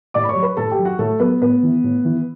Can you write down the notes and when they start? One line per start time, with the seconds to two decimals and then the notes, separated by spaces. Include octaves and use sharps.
0.14 A2 D5 D6
0.24 B5
0.29 C#5 C#6
0.35 F#3
0.43 B4 B5
0.57 A2 A4 A5
0.72 G4 G5
0.79 F#3
0.85 F#4 F#5
0.99 A2 A3 A4
1.20 F#3 B3 B4
1.41 A2 B3 B4
1.63 E3
1.84 A2
2.05 E3